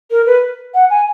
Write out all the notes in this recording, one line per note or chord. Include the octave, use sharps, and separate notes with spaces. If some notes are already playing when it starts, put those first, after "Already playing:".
A#4
B4
F#5
G#5